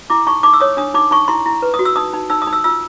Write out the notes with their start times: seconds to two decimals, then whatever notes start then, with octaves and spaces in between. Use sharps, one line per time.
0.10 E4 D6
0.27 D#4 C#6
0.43 D#4 D6
0.53 E6
0.60 C#5 D#6
0.77 D4 D#6
0.94 D#4 D6
1.11 D#4 C#6
1.28 E4 C6
1.46 E4
1.62 B4
1.74 D#6
1.79 F#4
1.85 E6
1.96 D#4 D#6
2.14 D#4
2.30 D#4 E6
2.42 D#6
2.47 D#4
2.53 E6
2.64 F4 E6